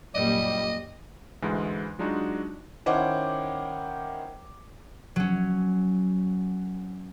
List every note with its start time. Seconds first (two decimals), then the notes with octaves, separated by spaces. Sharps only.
0.14 F#2 A#2 G3 D5 D#5
1.42 D2 G#2 E3 G#3
1.99 F#3 G#3 D4 D#4 F4 F#4
2.86 D#3 C#4 E4 C5 F#5 D6
5.16 F#3 C#4